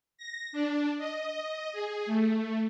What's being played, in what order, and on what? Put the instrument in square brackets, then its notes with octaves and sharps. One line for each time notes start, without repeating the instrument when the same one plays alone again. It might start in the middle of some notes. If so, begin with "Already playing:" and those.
[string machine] A#6
D4
D#5
G#4
A3